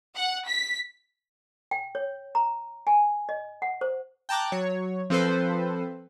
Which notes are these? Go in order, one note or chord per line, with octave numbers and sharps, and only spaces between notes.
F#5
B6
G5
C#5
A#5
G#5
D#5
F#5
C5
G5 A5 A#5 D6 F#6
F#3 C#5
F3 C4 A4 B4 C5